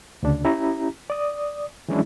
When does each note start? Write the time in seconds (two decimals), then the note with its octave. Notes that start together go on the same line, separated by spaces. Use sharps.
0.23 D2 C#3 D4
0.45 C#4 E4 G4 A#5
1.10 D5 D#6
1.89 E3 F#3 G#3 C#4 D4 E4